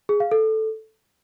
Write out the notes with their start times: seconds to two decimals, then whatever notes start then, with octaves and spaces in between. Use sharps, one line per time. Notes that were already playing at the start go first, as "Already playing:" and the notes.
0.09 G#4
0.20 F5
0.31 A4